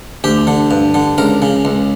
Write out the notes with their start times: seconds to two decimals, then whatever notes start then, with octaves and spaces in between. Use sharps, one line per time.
0.24 D2 G4
0.47 D3
0.71 G2
0.94 D3
1.18 C#2 A#4
1.42 C#3
1.65 C#2